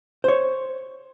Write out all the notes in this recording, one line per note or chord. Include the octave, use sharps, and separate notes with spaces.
C5 C#5